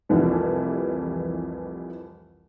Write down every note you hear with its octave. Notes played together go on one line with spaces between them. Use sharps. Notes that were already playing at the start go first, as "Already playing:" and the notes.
C2 F2 E3 F3 G3 A3